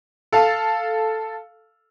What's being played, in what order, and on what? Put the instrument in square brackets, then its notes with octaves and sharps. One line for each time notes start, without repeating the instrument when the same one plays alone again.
[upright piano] A4 F5 A5